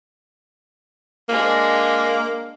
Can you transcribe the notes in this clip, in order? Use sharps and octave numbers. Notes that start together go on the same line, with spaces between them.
G#3 A#3 D4